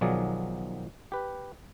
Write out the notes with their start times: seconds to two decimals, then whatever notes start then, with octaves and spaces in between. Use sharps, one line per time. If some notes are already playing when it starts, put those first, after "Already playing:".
0.01 B1 D#3 F3 F#3 G#4 D5
1.12 G4 B4